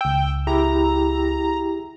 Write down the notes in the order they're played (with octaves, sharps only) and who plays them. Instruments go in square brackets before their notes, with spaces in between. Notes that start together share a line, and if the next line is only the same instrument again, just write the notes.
[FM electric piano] C#2 E6 [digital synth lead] G5
[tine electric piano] E4 G4 G#4 [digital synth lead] A#5